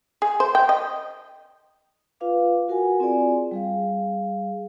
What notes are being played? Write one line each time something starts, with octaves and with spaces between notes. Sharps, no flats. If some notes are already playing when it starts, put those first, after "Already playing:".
G#4
C5
G5
D#5
F4 B4 F5 D6
F#4 A#4 F#5 G#5
C4 F4 G#4 D5 G#5
G3 G#4 F5